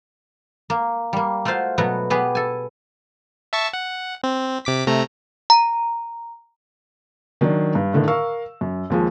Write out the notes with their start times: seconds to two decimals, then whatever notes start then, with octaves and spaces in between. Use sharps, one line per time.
0.70 A#3
1.13 G3 A#3
1.45 A3 F4 F#4 C5 F5
1.78 B2 F#3 A3 B3 F#4
2.10 B3 G4 G#4 B4
2.35 A4 G#5
3.53 E5 A5 C#6
3.73 F#5
4.24 C4
4.65 C3 D6 B6
4.87 C3 A3 A#5
5.50 A#5
7.41 D#3 F#3 D4
7.75 G2
7.93 A2 D3 D#3
8.08 A#4 F5 C#6 E6
8.61 F#2
8.90 D#2 F3 G#3